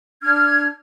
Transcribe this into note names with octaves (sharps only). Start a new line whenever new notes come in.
D4 F6 G#6